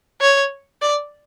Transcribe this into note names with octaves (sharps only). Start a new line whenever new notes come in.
C#5
D5